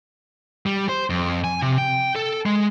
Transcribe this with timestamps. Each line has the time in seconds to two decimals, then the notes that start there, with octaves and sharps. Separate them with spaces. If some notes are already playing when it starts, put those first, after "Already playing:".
0.66 G3
0.89 C5
1.10 F2
1.44 G#5
1.62 C3
1.78 G5
2.16 A4
2.46 G#3